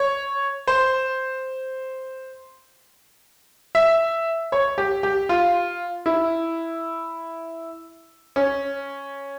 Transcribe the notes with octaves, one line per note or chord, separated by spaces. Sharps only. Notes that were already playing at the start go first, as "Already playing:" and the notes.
Already playing: C#5
C5
E5
C#5
G4
G4
F4
E4
C#4